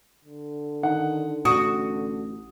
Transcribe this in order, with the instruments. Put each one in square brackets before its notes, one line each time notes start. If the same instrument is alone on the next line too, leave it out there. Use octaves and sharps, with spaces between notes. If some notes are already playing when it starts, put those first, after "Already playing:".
[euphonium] D3
[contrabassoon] D#3 [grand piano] F#5
[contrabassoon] A1 [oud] F#4 [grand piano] D#6